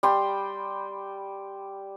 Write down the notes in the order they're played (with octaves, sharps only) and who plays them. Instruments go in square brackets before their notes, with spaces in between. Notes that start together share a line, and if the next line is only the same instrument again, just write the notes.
[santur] G3 G5 C6